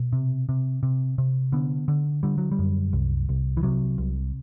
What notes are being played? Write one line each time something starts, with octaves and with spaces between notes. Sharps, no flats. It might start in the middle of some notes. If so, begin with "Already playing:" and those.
Already playing: B2
C3
C3
C3
C3
D3 B3
D3
D3 G3
F#3
G3
F#2
C2
C2
E3
C3 F#3
C2